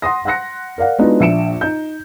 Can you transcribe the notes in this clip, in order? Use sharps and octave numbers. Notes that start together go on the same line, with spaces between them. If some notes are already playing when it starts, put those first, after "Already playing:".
F#5 C6 D#6 A#6
F#5 C6 F#6 A#6 C#7
A#4 D5 F5 F#5
G#3 B3 D4 D#4 F4 F#4
A#1 D4 E5 C#7 D7 E7
D#4 G6